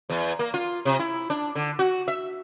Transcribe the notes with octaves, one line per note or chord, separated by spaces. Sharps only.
E2
A#3
F4
C3
E4
D4
D3
F#4
E5